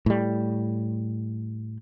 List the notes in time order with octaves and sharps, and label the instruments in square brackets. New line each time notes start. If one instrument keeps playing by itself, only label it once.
[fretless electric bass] A2 G3